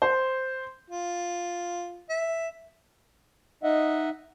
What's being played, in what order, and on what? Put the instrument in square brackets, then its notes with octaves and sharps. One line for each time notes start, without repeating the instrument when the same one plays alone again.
[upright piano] C5
[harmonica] F4
E5
[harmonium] D#4 D#5 E5 F#5